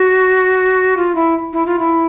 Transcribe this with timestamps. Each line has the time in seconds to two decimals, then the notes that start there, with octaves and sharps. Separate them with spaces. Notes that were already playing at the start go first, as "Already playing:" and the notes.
Already playing: F#4
0.97 F4
1.15 E4
1.53 E4
1.66 F4
1.79 E4